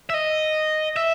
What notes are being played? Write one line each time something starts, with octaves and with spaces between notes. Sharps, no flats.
E5
D#5
E5